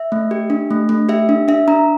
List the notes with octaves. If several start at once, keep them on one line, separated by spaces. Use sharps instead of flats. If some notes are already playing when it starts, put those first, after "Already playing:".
Already playing: E5
A3
G4
D4
A3
A3
G4 E5
D4
D4 E5
D4 A#5